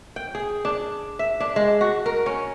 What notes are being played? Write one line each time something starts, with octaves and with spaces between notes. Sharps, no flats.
G5
G#4
D4
E5
D4
G#3
F#4
A#4
C#4